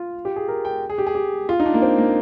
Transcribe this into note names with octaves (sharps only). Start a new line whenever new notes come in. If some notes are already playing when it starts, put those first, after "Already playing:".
Already playing: F4
G4
G#4
A#4
G5
G#4
G4
G#4
G4
F4
D#4
D4
A#3
C4
A#3